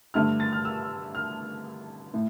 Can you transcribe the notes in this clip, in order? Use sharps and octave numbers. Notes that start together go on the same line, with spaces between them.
G2 D3 A3 F6
A6
F6
E6
F6
A2